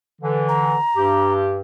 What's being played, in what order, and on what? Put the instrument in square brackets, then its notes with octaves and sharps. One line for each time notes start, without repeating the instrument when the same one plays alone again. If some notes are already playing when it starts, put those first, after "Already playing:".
[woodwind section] D3 E3
[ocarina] A#5
[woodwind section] G2 G4